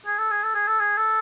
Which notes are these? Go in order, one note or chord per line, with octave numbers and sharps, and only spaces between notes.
G#4
A4
G#4
A4
G#4
A4
G#4
A4